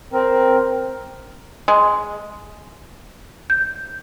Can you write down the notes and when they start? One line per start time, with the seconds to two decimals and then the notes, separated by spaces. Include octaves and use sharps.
0.13 C4 A#4
1.68 G#3
3.50 G6